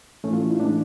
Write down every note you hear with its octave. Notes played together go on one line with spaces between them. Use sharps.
A2 E3 A3 C#4
F4
E4
D#4
A2 E3 G#3 D4